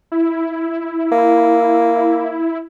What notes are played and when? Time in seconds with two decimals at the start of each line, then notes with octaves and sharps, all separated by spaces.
0.12 E4
1.12 A#3